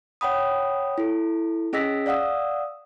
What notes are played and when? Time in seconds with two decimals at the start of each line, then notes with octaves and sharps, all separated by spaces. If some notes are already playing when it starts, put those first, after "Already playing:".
0.21 C#5 F#5 G5 B5 D#6
0.98 E4 A4
1.73 C#4 G#4 D#5 E6 A#6 B6
2.06 D5 F5 F#5 D#6 E6